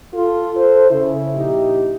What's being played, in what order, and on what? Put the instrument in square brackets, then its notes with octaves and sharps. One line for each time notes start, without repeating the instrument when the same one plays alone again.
[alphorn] F4 [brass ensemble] A4
[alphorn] C5
[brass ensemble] C#3 [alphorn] E4
[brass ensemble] A#1 D#4 G4